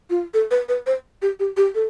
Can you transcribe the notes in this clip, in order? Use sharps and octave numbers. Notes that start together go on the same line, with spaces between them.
F4
A4
B4
B4
C5
G4
G4
G4
A4